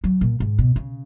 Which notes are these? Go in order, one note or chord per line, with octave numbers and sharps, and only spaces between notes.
F#3
A#2
G#2
B2
C#3